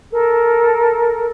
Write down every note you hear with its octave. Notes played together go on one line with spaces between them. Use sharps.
A4 A#4